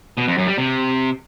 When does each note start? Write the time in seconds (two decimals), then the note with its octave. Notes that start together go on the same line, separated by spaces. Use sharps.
0.17 B2
0.28 F2
0.38 F#2
0.48 G3
0.58 C3